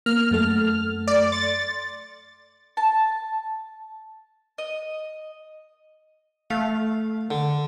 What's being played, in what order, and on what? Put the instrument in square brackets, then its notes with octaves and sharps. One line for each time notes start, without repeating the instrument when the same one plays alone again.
[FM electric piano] A#3 [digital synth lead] F6
[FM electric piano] F#2 A3 A4
[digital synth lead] D5
[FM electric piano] C6 C#7 [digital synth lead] A6
[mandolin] A5
D#5
[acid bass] A3 [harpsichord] F5
[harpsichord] D3